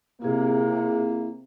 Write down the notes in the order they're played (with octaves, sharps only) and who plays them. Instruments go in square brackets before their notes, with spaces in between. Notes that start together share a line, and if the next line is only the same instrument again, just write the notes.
[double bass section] C3 [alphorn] A#3 [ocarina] E4 [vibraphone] F4 G#4